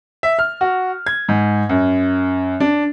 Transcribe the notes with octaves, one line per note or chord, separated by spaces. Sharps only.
E5
F6
F#4
G#6
G#2
F#2
D4